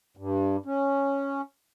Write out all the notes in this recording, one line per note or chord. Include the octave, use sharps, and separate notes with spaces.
G2
C#4